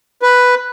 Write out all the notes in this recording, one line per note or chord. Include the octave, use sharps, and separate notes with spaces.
B4